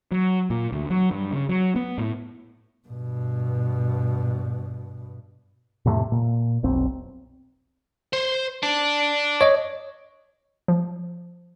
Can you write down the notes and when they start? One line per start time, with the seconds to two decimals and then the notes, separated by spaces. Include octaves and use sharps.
0.12 F#3
0.50 A#2
0.72 D2
0.90 F#3
1.11 G2
1.32 C#3
1.49 F#3
1.76 B3
1.98 A2
2.88 G2 B2
5.85 F2 A2 C3 A3
6.12 A#2
6.63 F1 B1 C4
8.13 C5
8.63 D5 A5
9.41 C#5 D#5
10.68 F3